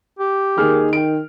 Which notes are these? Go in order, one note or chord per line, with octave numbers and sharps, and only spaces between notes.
G4
D#2 D#3 G#4 F6
G5 D7